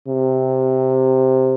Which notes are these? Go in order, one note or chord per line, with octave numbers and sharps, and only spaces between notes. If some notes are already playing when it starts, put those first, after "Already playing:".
C3